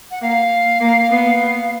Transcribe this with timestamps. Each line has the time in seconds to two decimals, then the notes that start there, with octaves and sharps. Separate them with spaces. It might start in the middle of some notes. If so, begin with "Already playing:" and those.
0.11 F#5
0.21 A#3 F5
0.80 A#3
1.10 B3